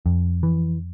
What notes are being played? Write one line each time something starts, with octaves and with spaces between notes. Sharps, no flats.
F2
E3